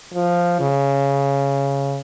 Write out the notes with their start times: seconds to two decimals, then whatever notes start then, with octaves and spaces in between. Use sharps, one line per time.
0.14 F3
0.60 C#3